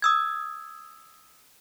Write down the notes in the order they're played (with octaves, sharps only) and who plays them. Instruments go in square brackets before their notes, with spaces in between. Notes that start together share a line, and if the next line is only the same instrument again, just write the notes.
[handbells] D#6 E6 G#6